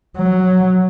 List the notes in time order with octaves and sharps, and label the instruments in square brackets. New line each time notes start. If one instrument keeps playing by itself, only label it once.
[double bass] F#3